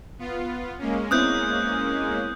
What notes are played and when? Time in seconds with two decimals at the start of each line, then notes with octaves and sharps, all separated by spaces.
0.19 B3 F4
0.78 G#3 A#3 C#4
1.11 B3 C4 E4 D#6 F#6 G6